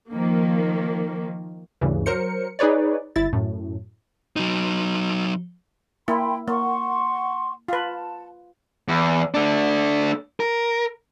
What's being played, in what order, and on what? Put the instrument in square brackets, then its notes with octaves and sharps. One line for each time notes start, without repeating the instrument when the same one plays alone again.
[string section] D#3 F3 A#3
[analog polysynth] D2 G2 C#3 E3
F#3 A#4 C5 C#7
D#4 G#4 B4 C#5 D5
G1 E4 A6
F#2 A2
[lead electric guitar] F#3 D#4
[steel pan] A#3 E4 [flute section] G5 B5 C6
[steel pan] A#3 [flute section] F#5 C6 C#6
[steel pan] F4 B4 [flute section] A5
[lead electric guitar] E2
A3 D4
A#4